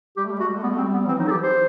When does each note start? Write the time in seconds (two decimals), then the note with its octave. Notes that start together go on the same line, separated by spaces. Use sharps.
0.17 G3 G4
0.25 A3
0.32 G3
0.40 A3 F#4
0.49 G3
0.57 A3
0.63 G3 B3
0.73 A3
0.78 C4
0.81 G3
0.94 B3
1.08 E3 C4
1.19 F#3 D#4
1.27 A4
1.31 E3 G4
1.42 C5